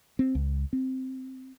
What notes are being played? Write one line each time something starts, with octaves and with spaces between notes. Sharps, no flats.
C4
C#2
C4